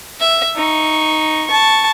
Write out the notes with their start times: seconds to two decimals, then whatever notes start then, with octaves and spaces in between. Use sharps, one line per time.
0.20 E5
0.56 D#4 C#6
1.47 A5 C#6